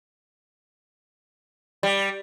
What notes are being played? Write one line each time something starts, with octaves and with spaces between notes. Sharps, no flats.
G3